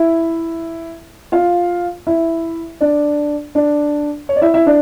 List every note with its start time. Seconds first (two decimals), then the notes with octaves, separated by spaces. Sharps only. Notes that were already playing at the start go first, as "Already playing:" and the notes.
Already playing: E4 E5
1.32 F4 F5
2.07 E4 E5
2.81 D4 D5
3.55 D4 D5
4.29 C#5
4.36 D5
4.41 E4 E5
4.54 E4 E5
4.66 D4 D5